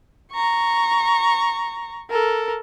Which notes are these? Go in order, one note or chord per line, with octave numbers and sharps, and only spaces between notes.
A#5 C#6
A4 A#4